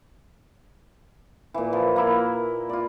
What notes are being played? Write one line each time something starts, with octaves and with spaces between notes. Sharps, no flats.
A#2 E3
F3
A#3 E4
F4 D5